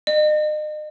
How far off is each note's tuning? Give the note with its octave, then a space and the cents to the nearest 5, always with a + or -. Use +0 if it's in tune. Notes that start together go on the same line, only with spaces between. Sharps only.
D#5 -40